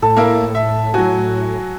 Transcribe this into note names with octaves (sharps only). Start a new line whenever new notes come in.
A2 A4
A#3 E4 A#4
E5
F#3 F#4 G#5